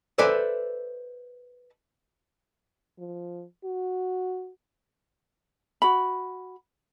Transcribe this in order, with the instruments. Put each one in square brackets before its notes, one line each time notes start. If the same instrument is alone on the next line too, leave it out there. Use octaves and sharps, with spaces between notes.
[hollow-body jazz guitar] A4 B4 C5 D5 E5 G#5
[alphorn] F3
F#4
[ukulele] F#4 B5